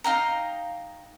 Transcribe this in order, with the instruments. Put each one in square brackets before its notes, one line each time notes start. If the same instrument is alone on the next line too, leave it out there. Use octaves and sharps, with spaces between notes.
[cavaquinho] D#4 F5 G5 A#5